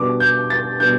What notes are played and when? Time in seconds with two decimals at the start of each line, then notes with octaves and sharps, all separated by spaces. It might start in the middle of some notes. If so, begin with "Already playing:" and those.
Already playing: B2 G3 B3 D4 D6
0.20 G6
0.50 A6
0.80 B2 G3 B3 D4 G6